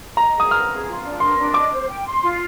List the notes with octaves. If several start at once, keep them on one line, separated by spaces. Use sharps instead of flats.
D#5 A#5
G#4 D#6
A#5 F6
G#4
F4
D4
A#4 C6
D4
D#5 D6
C5
G5
C6
F4